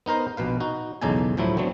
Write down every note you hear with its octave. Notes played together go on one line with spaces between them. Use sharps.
B3 D#4 A#4 C5
A#1 B2 B4 F5
D#4 F#4
B1 E2 C#3 D#4 A4 G#5
D2 A2 F3 F#3 E4
D3 F#3 A3 B3 C4